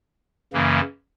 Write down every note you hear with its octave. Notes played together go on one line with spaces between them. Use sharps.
F#2 C#3 E3 A#3